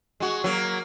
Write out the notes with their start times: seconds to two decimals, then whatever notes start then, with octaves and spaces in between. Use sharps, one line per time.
0.20 G#3 F#4
0.44 F#3 A#3